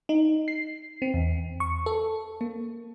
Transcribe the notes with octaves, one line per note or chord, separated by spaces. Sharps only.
D#4
C7
C4
E2
C#6
A4
A#3